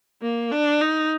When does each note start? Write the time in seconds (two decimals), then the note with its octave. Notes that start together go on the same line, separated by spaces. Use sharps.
0.22 A#3
0.51 D4
0.81 D#4